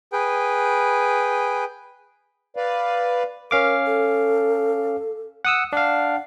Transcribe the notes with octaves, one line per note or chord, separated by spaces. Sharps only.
G#4 B4 G5
B4 D5 F5
C#4 A#4 F5 D6
A4
F#5 D#6 E6
D4 F5 F#5